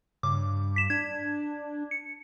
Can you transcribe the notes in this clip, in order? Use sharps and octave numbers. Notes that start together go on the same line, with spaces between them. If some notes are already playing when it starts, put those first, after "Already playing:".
G2 C#3 D6
B6 E7
D4 G#6
C#7